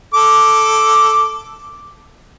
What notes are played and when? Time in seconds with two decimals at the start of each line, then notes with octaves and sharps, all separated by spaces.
0.14 A4 D6